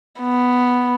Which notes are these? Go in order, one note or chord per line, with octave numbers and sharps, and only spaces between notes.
B3